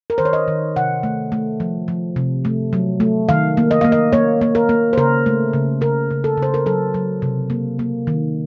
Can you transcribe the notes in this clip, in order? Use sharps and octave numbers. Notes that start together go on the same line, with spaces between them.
A#4
D#3 C5
C#5
D#5
D#3
C3 F#5
A3
A3
F3
F3
C3
A3
F#3
A3
D#3 F5
A#3
D#5
A#3 F5
D#5
A#3 C#5
A#3
A#4
A#3
C5
C#3 A#4
A3
C#3
C#3 A#4
C#3
A4
C#3
C5
A#4
F#3 A4
F#3
C3
A#3
A#3
D#3